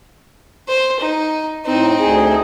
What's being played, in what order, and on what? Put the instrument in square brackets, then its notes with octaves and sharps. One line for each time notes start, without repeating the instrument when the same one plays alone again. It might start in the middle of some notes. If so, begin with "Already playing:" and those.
[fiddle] C5
D#4
[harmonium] A2 [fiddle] C4 D#4
[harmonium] D2 G#4